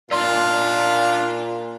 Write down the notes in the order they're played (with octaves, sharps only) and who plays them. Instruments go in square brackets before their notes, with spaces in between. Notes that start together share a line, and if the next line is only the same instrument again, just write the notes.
[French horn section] A#2 [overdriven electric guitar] D4 D#4 [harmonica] F4 [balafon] D5 C6